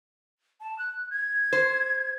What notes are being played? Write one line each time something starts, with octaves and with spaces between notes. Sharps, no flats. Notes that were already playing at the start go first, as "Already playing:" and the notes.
A5
F#6
G#6
C5